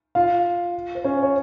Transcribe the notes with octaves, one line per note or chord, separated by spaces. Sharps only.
F4 F5
C5
C#4 C#5
C#5